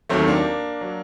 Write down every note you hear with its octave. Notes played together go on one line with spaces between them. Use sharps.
D#2 D#3 F#3 A3 C4
A#3 D4
F#3